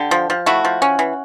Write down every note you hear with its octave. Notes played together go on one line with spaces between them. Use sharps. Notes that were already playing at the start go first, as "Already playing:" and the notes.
Already playing: D3 G4
F3
F3
A3 E4 F#4
F3
C#4
E3